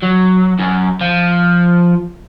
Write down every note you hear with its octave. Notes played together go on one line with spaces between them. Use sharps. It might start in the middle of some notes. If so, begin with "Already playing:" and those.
F#3
F#2
F3